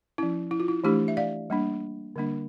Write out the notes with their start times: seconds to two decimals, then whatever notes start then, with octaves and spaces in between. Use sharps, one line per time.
0.18 F3 C#4 E4
0.51 E4
0.60 F4
0.68 E4
0.84 E3 A3 D4 E4 G4
1.08 E5
1.17 D5 F5
1.50 G3 A#3 D4
2.16 D3 G3 A#3 D4